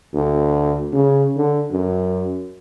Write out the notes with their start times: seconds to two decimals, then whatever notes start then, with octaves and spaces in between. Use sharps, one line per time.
0.13 D2
0.92 C#3
1.37 D3
1.72 F#2